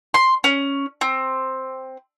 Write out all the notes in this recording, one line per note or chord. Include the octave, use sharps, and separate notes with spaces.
C6
C#4
C4